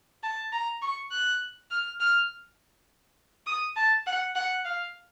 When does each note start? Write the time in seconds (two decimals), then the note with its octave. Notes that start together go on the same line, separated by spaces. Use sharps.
0.23 A5
0.52 A#5
0.82 C#6
1.11 F#6
1.71 F6
2.00 F6
3.47 D#6
3.77 A5
4.06 F#5
4.35 F#5
4.65 F5